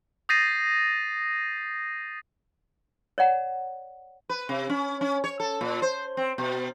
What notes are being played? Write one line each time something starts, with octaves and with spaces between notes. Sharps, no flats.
D#6 G6 A6 A#6 C7 D#7
C#5 D5 F#5 A#5
B4
C3
C#4
C#4
C#5
A4
A#2
C5
C4
B2